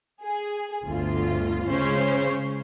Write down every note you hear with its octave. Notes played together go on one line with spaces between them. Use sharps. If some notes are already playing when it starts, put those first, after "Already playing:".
G#4
G1 D2 F4
C#3 G#3 C#4 C5 C#5